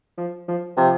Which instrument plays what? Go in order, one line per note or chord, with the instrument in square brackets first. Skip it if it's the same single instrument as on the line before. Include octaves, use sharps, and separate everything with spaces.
[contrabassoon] F3
F3
[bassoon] C3 [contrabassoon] F3